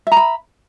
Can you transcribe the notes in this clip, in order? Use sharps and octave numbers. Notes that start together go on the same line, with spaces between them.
E5 A#5 B5